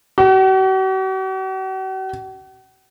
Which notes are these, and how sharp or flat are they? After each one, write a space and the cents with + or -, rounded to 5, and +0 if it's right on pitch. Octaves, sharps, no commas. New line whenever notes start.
F#4 +45